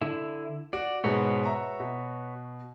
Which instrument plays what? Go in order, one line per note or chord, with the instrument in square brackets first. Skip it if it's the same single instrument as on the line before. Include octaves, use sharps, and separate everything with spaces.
[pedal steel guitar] D3 E4
[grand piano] F#4 [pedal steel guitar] D5
[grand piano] G#2 B2 G#3 [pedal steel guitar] F#4 B4 C#5
[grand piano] E5 A#5 C#6
B2